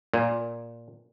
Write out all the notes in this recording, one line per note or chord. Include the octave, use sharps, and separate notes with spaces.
A#2